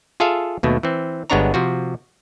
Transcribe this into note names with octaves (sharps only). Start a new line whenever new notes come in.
F4 G#4 A4 E5 F5
D#2 B2 A3
E3 C4
G1 G#3 B3 D4 C#5 A#5
C3 F3 F#4